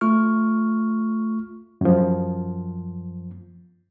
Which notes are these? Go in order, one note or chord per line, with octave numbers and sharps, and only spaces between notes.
A3 F4 C#6 F6
F#2 F3